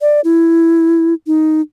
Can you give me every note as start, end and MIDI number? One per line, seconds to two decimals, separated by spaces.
0.01 0.21 74
0.24 1.14 64
1.27 1.61 63